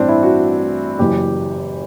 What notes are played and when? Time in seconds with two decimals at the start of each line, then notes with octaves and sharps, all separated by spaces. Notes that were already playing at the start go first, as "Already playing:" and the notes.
Already playing: A1 G2 E3 C4 D4
0.08 E4
0.23 F#4
0.99 F#1 F#2 E3 G4